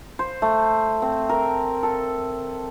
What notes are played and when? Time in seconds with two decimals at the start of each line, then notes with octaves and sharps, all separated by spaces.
0.19 C5
0.42 A3
1.02 C4
1.29 A#4
1.83 A4